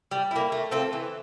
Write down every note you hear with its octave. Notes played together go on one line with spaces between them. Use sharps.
G3
A#3 E4
A3
C4 F4 A4
E3